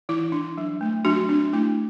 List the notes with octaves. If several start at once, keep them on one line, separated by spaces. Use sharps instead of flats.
E3 E4
D4
F#3
A3
F#3 D4 F#4
C4 D4
A3 E4